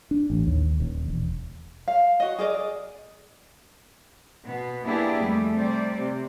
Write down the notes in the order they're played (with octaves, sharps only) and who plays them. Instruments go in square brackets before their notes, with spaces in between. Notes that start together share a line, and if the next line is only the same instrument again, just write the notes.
[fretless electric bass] D4
A1
D#2
D#1
E1
[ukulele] F5
F#4 D#5
G#4 A#4 D5 D#5
[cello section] B2 B3
A#3 B3 D4 E4 G4 G#4
F2 G3 A3
C3 G3 C5 D5
C3